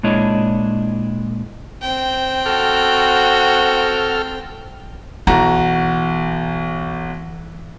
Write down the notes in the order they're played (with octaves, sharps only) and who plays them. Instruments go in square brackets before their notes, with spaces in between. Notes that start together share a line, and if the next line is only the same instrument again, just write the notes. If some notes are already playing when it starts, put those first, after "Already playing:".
[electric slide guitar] A#2 G#3 D4 E4 C#5 D#5
[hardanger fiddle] C4 G5
[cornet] F#4 [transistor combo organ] A4 F6
[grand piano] B1 F#4 A#5 [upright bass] E3